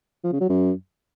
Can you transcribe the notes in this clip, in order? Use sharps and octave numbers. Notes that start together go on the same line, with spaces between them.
F3
C#3
F#3
F#2